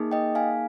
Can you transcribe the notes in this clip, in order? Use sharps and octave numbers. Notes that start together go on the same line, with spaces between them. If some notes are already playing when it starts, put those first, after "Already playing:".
Already playing: A#3 D#4 G#4
D#5 G5
F5 G#5